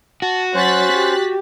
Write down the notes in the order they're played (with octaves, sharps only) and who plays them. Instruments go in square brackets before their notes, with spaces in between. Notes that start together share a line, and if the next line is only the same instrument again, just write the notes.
[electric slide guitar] F#4 [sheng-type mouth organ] A5
[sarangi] F#3 [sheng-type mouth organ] C#4 C5 [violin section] F#6 A6 B6
[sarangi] G4